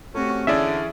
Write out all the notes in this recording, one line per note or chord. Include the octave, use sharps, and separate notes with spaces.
A3 C4 C#4 F#4 G4
D3 E3 C#4 G#4 D5 E5 E6 G#6